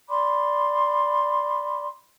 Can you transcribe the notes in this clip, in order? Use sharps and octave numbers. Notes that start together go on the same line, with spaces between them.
D5 B5 C6 D6